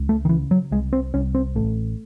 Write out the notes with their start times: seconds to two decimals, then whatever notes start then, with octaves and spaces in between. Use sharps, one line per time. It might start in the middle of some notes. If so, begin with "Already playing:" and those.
Already playing: C#2
0.09 A3
0.25 D#3
0.29 C#3 E3
0.51 F#3
0.71 C2 G#3
0.93 C4
1.14 C2 C#4
1.35 C4
1.56 A1 A3